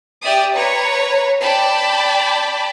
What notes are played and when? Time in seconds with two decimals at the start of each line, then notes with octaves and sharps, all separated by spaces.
0.22 G4 D5 E5 D#6
0.55 B4 C#5 A#5
1.41 D5 G5 A5 B5